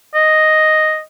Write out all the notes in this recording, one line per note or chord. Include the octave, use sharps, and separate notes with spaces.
D#5